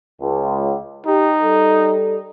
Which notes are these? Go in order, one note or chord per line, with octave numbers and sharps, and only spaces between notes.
C#2
D#4 G4
G3 A4